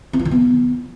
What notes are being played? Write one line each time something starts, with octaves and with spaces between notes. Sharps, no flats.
C4
F4
D#3
B3